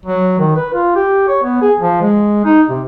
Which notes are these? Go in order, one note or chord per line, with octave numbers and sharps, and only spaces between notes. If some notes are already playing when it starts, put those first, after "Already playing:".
F#3
D#3
B4
F4
G4
C#5
B3
G#4
F3
G#3
D#4
C3